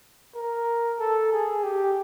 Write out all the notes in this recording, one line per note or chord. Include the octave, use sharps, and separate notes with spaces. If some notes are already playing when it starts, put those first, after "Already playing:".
A#4
A4
G#4
G4